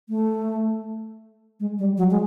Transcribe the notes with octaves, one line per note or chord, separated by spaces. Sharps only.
A3
G#3
G3
F#3
G#3